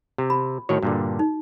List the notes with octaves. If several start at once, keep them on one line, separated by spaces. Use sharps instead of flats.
C3
B5
A2 D#3 F#4 C#5
G2 A#2 D3
D#4